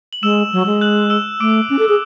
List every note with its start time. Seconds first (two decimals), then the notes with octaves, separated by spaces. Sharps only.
0.13 F#7
0.23 G#3 E6 E7
0.53 F#3
0.66 G#3
0.81 F#6 F#7
1.10 E6 E7
1.40 A3 D6 D7
1.70 C#4
1.79 A4
1.89 G#4